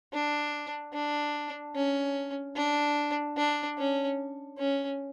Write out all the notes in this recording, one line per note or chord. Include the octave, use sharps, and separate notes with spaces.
D4
D4
C#4
D4
D4
C#4
C#4